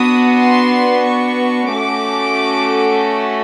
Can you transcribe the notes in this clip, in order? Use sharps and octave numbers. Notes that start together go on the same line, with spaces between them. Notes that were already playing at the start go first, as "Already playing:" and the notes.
Already playing: B3 D4 F#4 D#6
C6
C#6
A3 C#4 F#4 A4 D6